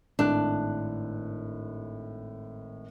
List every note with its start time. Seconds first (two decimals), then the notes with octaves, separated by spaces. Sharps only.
0.19 G#1 A2 D4 F#6